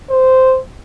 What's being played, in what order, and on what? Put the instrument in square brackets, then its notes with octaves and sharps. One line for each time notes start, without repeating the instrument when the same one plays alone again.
[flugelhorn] C5